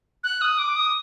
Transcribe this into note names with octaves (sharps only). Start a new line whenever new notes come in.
F#6
D#6
D6
D#6